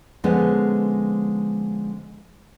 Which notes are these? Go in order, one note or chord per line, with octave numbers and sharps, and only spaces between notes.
D3 F3 G#3 B3 C#4